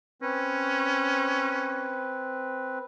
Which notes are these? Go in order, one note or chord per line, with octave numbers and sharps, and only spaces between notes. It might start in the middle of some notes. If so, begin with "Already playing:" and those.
C4 C#4 B4